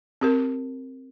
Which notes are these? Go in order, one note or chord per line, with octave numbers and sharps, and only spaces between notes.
C4 G4 A#4